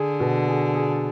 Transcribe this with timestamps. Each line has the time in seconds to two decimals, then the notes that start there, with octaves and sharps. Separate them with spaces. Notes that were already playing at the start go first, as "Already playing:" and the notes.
Already playing: D3 G#4
0.20 B2
0.48 G#4
0.75 G#4